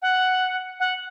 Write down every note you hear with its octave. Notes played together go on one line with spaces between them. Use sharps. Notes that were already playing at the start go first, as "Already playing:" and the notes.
F#5
F#5